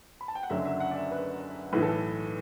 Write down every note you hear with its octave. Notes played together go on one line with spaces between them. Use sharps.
B5
A5
G5
F#5
F#1 F#2 D3 F#3 E5
E5
F#5
D5
E5
B4
B1 A2 E3 B4
A4